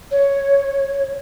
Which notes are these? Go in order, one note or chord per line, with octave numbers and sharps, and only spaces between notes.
C#5